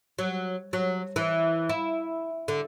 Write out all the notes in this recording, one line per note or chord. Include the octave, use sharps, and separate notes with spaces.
F#3
F#3
E3
E4
D3